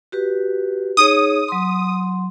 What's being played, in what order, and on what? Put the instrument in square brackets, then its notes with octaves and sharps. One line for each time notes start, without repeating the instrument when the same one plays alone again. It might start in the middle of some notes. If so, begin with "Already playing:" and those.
[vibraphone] F#4 G4 B4
[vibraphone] D#4 G#4 C#5 [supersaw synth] D#6
[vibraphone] F#3 C6